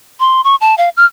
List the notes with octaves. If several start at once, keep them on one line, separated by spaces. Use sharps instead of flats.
C6
C#6
A5
F5
F6